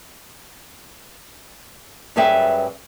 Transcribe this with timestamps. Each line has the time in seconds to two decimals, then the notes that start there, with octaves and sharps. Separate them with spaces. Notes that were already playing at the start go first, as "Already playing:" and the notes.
2.16 F#2 G3 G#4 B4 E5 G5